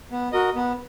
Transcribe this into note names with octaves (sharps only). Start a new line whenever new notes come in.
B3
F#4 A#4 D#5
B3